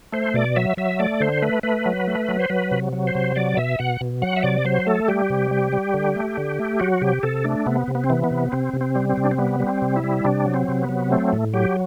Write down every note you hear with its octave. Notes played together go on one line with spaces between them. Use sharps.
A3 C5
B2 D5
F#3 E5
F#3 E5
A3 D5
D3 C5
A3 B4
A3 B4
F#3
A3
F#3
C5
F#3 B4
C3
F#3
C5
C3
F#3 D5
B2 E5
B2 F#5
B2
F#3 F#5
E5
C3 D5
F#3 C5
A3 A4
G3 G4
C3
G3
G3
D3
A3
D3
A3
F#3 F#4
C3 G4
C3 A4
A3 D4
C3 B3
C3
B3
C4
E3 B3
B3
C3
C3 C4
C3
C4
G3
C4
C3
D4
C4
G3 B3
G3
C4
C3
E4
G3
C3 D4
F#3
C4
C3
B3
F#3
A3 C4
A2
F#3 G4